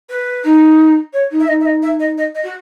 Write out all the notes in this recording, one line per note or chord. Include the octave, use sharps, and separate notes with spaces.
B4
D#4
C#5
D#4
E5
D#4 D#5
E5
D#5
E5
D#5
D#5
D#5
F#4